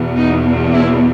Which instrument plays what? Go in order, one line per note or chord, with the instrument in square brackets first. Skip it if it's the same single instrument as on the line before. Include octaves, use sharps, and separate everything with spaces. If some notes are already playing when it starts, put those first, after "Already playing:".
Already playing: [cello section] E2 B2
B3 D#4
C#4 E4